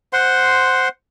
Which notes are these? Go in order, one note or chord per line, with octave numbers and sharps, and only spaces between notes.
C5 F#5 C6